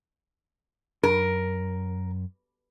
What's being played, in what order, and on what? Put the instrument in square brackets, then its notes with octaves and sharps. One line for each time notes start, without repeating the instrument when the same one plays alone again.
[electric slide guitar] F#2 [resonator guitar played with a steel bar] A#4